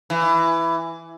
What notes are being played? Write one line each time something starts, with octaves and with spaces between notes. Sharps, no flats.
E3